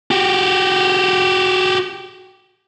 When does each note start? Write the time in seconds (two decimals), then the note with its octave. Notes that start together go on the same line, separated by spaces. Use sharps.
0.11 F#4 G4